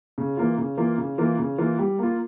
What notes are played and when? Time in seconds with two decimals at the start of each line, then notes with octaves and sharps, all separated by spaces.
0.18 C#3
0.37 E3 A#3 F4
0.58 C#3
0.77 E3 A#3 F4
0.98 C#3
1.18 E3 A#3 F4
1.39 C#3
1.58 E3 A#3 F4
1.79 G3
1.99 A#3 F4